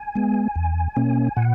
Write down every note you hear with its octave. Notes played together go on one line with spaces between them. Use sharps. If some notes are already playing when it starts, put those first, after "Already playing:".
Already playing: G#5
G#3 B3
E2
B2 A#3 C#4
A#2 F#5